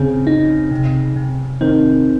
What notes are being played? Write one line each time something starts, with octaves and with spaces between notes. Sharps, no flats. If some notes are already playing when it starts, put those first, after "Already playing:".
Already playing: C#3 C4
D#4
C3
C3
D#3 C4